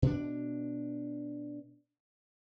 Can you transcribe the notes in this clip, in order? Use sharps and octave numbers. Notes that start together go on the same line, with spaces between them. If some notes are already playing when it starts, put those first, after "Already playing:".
B2 D4